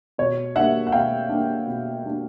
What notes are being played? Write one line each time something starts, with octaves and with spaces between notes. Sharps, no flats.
B2 C#5
G3 A#3 D4 E5 F#5
F#5
B2 F5 G5
G3 A#3 D4
B2
G3 A#3 D4